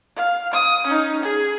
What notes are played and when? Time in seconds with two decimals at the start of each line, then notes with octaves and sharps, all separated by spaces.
0.16 F5
0.54 D#6
0.87 C#4 D#4
1.23 G#4